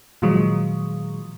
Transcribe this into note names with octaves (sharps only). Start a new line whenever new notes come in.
A#2 D#3 F3 F#3 G#3